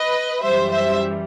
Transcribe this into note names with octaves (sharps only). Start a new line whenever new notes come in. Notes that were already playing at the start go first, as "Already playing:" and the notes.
Already playing: B4 D#5
F#2 E3 G3 C5 E5
C5 E5